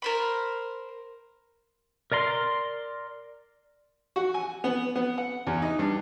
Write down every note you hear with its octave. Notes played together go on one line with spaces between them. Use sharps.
A#4 C5 B5
A#4 D5 A#5 C6
F#4
G#5
B3
B3
F#5
E2
D#4
G2